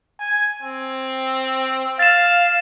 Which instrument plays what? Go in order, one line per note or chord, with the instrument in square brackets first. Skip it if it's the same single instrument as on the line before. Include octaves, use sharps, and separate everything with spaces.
[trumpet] G#5
C4
[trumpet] F5 [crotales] A6 E7